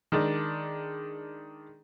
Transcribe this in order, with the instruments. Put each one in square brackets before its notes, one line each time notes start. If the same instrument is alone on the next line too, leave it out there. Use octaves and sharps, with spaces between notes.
[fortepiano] D#3 G#3 D4